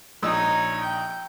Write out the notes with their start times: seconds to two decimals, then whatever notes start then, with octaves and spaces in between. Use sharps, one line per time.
0.23 A#1 D#4 C#5 D#5 E6
0.81 G5